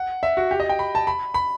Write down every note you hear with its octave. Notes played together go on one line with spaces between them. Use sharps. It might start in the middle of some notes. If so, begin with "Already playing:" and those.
Already playing: F#5
E5
F#4
G4
D#5
G5
B5
A5
B5
B5